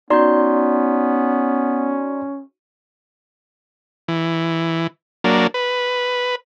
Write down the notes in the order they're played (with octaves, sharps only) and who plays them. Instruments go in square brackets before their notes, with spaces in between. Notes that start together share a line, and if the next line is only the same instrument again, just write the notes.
[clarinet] B3 [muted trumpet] C#4 [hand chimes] D#4 F#4 G6 [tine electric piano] D5 A#5 C6
[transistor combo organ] E3
F#3 A#3 D4
B4